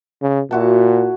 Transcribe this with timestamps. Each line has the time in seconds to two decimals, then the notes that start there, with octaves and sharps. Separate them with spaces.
0.22 C#3
0.51 A#2 E4 F#4 A5